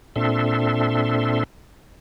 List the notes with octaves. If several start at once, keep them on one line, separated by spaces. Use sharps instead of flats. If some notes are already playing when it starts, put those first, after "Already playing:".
A#2 C4 D4 A4 E5 C6